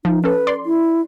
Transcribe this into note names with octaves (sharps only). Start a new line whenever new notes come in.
F3 D#4
C#4 A4 B4
D5 C6
E4